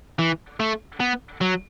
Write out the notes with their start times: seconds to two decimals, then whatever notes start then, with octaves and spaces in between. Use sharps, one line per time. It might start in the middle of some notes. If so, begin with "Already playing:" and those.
0.19 E3
0.60 A3
1.00 B3
1.41 F#3